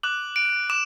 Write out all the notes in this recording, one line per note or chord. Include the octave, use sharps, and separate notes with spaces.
D6 F#6 F#7
D7
D6 E7